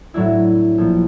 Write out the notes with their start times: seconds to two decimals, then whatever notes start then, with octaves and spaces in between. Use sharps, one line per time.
0.14 A2 F#3 D4 E4
0.78 A#1 F3